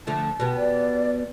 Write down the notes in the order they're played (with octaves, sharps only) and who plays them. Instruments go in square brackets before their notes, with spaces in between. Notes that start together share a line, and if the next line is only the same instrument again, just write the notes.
[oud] D3 F3 A3 [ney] A5
[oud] B2 B3 G4
[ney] D5